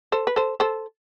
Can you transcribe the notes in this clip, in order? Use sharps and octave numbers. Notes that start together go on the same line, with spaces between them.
A4 C5
B4
A4 C5
A4 C5